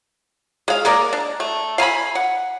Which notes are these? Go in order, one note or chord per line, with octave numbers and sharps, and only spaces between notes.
G#3 F5
G#3 A#3 A#4 D5
D4
A3
F5 G#5 A#5 B5
F#5